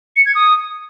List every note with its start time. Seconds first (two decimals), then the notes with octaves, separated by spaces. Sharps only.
0.16 C#7
0.26 G#6
0.35 D#6